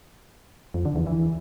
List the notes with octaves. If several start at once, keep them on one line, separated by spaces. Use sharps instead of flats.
F2
D3
E2
E3